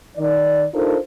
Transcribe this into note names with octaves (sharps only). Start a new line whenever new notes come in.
D#3 D5
D4 D#4 F4 A4 A#4 C5